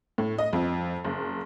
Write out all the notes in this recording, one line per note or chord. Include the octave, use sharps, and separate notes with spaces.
A2
D#5
F2
F#1